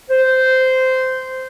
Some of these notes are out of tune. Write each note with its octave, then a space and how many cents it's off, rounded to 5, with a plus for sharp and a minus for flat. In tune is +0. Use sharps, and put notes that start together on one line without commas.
C5 -10